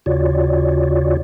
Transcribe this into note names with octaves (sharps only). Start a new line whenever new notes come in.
D#2 C#3 F4 F#4 C#5 D5